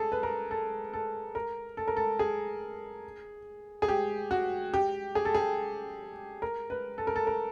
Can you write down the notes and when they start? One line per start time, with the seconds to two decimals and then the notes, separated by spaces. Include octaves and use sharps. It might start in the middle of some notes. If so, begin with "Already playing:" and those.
Already playing: G#4 A4
0.12 B4
0.23 A#4
0.51 A4
0.93 A4
1.35 A#4
1.77 A4
1.88 A#4
1.97 A4
2.19 G#4
3.82 G#4
3.88 G4
4.31 F#4
4.74 G4
5.15 G#4
5.25 A4
5.35 G#4
6.42 A#4
6.70 B4
6.98 A4
7.07 A#4
7.16 A4
7.27 A#4